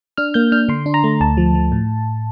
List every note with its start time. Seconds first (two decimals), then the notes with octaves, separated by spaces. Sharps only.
0.17 D4 F6
0.34 A#3 G6
0.52 D4 F6
0.69 D3 C6
0.86 D4
0.94 A#5
1.04 A3
1.21 D2 A5
1.37 F3
1.55 F3
1.72 A2